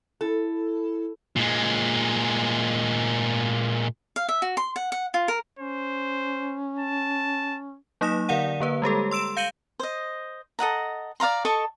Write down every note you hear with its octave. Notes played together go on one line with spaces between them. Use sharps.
E4 A4
A#2 G#3
F5
E5
F#4
C6
F#5
F#5
F4
A#4
C#4 C5
A5
F#3 A#3 D#4 D#6 A#6 E7
D3 A#4 D5 F5 F#5 D#7
D3 A#3 B4
G3 G#3 G4 A4
C6 E6 D7 E7
F5 G6 C#7 D#7 F#7 G7
C5 D#5
A4 D#5 F#5 A#5
D5 F5 A#5 C6
A4 D#5 A5 C#6